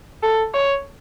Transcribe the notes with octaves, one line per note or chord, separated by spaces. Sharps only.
A4
C#5